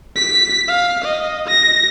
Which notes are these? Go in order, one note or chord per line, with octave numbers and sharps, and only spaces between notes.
B6
F5
D#5
A#6